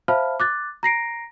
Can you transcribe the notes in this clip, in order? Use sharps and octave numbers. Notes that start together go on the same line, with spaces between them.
C5 E5 F5 A5 B5 F6
D6 F#6 A6
A#5 A#6 C7 D7